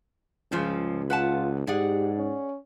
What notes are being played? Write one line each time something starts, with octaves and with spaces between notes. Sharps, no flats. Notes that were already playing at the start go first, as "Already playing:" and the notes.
C#2 G2 C#3 F3
F4 B4 F#5 A5
G#2 G4 G#4 D5 F#5
C#4